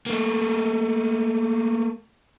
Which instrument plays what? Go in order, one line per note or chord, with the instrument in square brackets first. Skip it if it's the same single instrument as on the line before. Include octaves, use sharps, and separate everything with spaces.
[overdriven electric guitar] A3 A#3